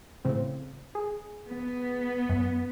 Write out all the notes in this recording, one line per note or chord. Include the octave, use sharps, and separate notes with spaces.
A2 C#3 C4
G#4
B3
F#2